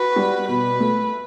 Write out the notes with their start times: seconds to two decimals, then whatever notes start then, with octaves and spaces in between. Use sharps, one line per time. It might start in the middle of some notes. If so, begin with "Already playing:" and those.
Already playing: F#4 B4
0.16 G3
0.48 B2 B4
0.80 A3